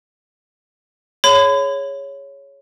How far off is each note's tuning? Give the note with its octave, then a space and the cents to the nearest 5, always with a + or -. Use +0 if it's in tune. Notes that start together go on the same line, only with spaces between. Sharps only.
G#4 +0 C#5 +0 B5 +40